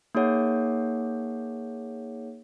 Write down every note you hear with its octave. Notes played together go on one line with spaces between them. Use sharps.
A#3 D#4 G#4 C#5 F#5